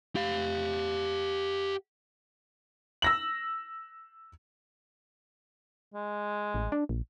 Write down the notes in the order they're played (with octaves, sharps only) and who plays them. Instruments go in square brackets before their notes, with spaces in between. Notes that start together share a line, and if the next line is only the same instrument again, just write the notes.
[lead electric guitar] G4 F5
[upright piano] E6 A#6 F#7
[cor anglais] G#3
[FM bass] A1
D4
A#1